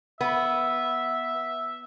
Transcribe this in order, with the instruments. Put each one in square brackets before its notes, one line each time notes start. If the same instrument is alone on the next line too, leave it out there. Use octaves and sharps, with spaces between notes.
[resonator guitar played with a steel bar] B3 [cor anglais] E5